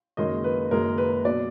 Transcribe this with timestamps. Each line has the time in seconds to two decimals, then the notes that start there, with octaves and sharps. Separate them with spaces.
0.17 F#1 F#2 D#3 G#3 D#5
0.44 B4
0.71 F#1 F#2 D#3 G#3 A#4
0.98 B4
1.25 B2 F#3 D5